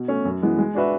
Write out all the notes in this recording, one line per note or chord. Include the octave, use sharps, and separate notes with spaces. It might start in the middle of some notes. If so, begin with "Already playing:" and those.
Already playing: B2
A3 C#4
F#2
E3 G#3 B3
G#3
D4 F#4 B4 E5